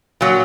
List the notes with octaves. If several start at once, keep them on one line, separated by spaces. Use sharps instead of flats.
A#2 F#3